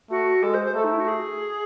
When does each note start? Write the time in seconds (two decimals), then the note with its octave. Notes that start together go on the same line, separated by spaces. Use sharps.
0.10 A3 F#4
0.42 G#3 A4
0.53 C5
0.64 C5
0.74 A3 A4
0.83 D#4
0.92 E4
0.99 F#4
1.07 G#4